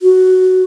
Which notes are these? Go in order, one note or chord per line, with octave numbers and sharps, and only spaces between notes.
F#4